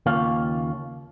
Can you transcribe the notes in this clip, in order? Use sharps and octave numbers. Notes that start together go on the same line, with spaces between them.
D#2 C#3 A#3 F4 C#5 F5